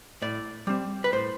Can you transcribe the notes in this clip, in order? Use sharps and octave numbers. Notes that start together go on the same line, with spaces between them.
A2 D5
G3 C4
B4
A2 C5